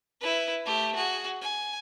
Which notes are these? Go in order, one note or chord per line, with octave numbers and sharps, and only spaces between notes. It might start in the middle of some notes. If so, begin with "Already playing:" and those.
E4 B4
A3 G4
F#4 G#4
G#5